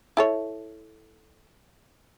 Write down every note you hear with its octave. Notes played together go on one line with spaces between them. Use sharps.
E4 A4 C#5